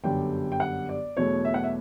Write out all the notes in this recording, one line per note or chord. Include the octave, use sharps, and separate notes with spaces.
G1 F#2 D3 G3 G5
G5
F#5
D5
E2 B2 F#3 A3 C#5
E5
F#5
E5